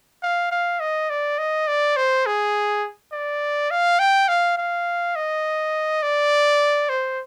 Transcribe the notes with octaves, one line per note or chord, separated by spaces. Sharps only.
F5
F5
D#5
D5
D#5
D5
C5
G#4
D5
F5
G5
F5
F5
D#5
D5
C5